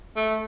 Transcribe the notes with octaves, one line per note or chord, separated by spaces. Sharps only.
A3